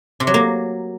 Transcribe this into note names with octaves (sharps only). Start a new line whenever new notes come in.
C3
F#3
A#3